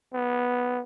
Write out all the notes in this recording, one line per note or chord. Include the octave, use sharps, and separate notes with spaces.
B3